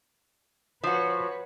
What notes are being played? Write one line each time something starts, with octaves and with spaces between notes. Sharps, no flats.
F3 F#4 B4 C#5